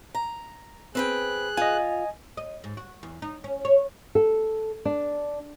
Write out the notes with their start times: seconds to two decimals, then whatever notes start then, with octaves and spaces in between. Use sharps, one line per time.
0.15 A#5
0.95 C4 G#4 B4 G5 F#6
1.57 F4 D#5 G#5
2.37 D#5
2.64 G#2
2.77 F#4
3.03 E2
3.22 D#4
3.44 C#4
3.65 C#5
4.15 A4
4.85 D4